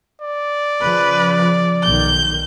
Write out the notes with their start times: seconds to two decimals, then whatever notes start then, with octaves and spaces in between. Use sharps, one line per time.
0.22 D5
0.81 C#3 F3 B4
1.83 B1 D#3 G6